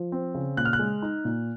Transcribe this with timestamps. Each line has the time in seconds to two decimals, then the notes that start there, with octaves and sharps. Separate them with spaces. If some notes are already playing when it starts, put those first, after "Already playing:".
Already playing: F3
0.12 C4
0.35 C#3
0.57 A#2 F#6
0.65 F6
0.73 F#6
0.79 G#3
1.02 D#4
1.25 A#2